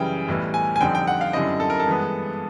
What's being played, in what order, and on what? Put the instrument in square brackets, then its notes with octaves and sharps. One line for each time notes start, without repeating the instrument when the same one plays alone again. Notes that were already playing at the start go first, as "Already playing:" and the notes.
Already playing: [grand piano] F#2 C#3 E3 G3 G5
B1 A2 E3 G3
G#5
G#5
F2 D3 G3 C4 D#4 G5
G5
F#5
F5
F#2 D3 G3 C4 E4 D#5
A4
A#4
A4
G2 E3 G#3 B3